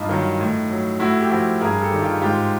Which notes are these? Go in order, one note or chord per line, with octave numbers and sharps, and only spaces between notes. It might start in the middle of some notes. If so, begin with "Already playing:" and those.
Already playing: G2 D#4 F4
D#3 F#3
A2
F#3
A2 E4 F#4
G4
F3 E4 F#4
G2 G#4 A#4
G4 A4
D#3 G3
F4 G4
G#2 F4 G4